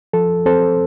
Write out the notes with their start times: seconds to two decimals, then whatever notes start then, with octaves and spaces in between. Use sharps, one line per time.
0.13 F3 A4
0.46 C4 A4 C5